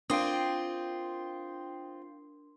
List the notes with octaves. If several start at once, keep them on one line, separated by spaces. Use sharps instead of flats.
C4 D4 F4 A#4 G5 C6 D#6